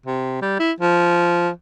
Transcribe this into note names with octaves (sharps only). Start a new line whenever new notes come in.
C3
G3
E4
F3